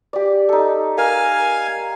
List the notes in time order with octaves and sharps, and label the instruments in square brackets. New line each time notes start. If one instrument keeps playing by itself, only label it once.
[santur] G4 D5
D#4 A4
[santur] A#4 [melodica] F5 G#5